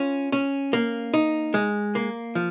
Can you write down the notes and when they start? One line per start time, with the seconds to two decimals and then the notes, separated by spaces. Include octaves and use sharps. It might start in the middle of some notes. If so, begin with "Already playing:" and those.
Already playing: C#4 F4
0.32 C#4
0.73 A#3
1.14 D#4
1.54 G#3
1.95 A#3
2.35 F3